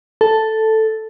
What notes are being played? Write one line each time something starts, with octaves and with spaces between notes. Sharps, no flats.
A4